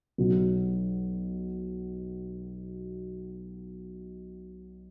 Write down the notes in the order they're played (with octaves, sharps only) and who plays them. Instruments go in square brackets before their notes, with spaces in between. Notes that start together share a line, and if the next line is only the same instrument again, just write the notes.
[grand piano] B1 B2 F#3